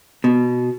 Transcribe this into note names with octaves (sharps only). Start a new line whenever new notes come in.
B2